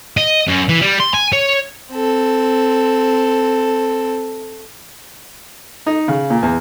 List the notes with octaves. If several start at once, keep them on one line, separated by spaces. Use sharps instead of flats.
D#5
F#2
E3
G3
C6
G#5
C#5
C4 A4
D#4
C#3
A#2
E2